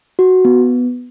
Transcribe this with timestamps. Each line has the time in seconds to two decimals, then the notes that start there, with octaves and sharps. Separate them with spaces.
0.19 F#4
0.45 B3